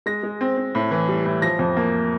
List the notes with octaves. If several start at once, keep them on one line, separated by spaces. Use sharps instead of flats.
G#3 A#6
G#3
C4
C4
A2
E3
G3
A2
F3 A#6
F2
A#3